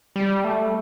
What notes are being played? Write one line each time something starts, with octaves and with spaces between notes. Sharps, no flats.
G3
A3